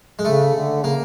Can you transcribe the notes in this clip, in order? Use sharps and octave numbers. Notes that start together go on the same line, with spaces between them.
G#3
C#3 A3
D3
C#3 A#3